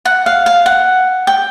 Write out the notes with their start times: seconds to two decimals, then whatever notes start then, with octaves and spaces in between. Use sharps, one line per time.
0.05 F#5
0.26 F5
0.46 F5
0.66 F#5
1.27 G5